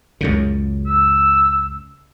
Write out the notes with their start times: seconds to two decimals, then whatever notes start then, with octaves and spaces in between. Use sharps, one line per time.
0.21 C#2 F#2 C#3
0.86 E6